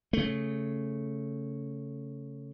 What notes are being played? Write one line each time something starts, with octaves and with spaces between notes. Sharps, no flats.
C#3 A3